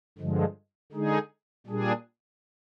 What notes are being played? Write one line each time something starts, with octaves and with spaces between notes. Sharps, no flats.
G2 D3 F3 G#3
D3 G#3 D#4 G#4
A#2 G3 D4 G#4